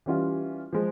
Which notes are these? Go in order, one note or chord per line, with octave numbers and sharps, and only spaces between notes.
E3 G3 C#4 F4
F3 G#3